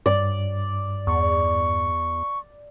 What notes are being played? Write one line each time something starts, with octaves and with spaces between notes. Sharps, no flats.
G2 D5
E2 C#6